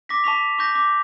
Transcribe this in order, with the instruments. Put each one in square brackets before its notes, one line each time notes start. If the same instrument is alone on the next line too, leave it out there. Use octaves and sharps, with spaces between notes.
[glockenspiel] D6 A#6 B6
A5 C#6 B6 F7
C#6 D6 G6 A#6
D6